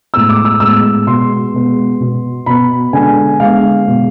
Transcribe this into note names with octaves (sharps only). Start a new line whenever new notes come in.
A2 G#3 B3 E6
D6
E6
A2 G#3 B3 E6
B2 G#3 B3 C6
B2 G#3 B3
B2 B3
B2 B3 B5
D3 G#3 B3 G#5
D3 G#3 B3 F5
B2 G#3 B3